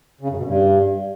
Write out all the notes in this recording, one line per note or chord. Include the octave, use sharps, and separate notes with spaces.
C#3
F#2
B2
G2